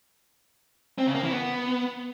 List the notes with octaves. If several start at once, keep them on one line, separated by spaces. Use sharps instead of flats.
C4
C#3
A#3
E3
B3